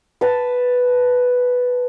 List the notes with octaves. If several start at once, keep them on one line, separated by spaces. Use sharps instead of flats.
B4 A5